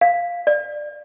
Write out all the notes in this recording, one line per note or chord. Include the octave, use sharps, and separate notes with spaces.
F5
D5